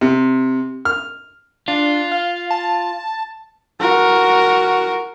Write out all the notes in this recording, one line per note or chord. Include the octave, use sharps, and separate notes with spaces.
C3
F6
D4 F4
F5
A5
F#4 A#4